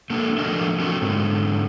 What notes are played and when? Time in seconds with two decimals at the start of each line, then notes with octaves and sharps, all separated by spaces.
0.10 A3 A#3 D4 G4 A4 A#4
0.38 F3 A3 D4 A4 A#4 D#5
0.79 A3 C4 F#4 A#4
1.02 G#2 D3